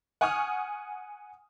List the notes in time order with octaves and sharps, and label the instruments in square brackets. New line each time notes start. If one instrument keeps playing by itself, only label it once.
[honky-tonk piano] F#5 G#5 C#6 D#6 F6